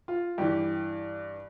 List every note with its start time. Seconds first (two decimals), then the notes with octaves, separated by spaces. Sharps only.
0.08 F4
0.38 G2 E3 G4